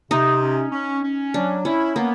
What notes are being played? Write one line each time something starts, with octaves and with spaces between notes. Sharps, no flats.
C3 D#4
C#4
C#4
C#4
F#3 D4
C#4 E4
A#3 B3